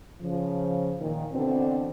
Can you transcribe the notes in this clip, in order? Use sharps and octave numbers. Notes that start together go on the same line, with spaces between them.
C#3 F3
A#2 D#3
B2 D3 E3 C4 D4